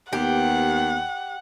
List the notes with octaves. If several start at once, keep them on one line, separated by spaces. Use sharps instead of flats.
D#2 B3 G4 F#5